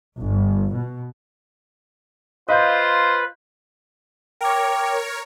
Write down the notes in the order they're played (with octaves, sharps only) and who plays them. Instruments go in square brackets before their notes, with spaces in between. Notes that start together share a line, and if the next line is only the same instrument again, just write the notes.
[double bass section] G1
B2
[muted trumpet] F4 [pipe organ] B4 [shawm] C5 [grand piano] D#5 F5 G6
[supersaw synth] A#4 C#5 [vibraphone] G5 D6